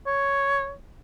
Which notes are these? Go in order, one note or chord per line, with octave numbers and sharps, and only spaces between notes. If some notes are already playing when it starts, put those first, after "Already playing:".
C#5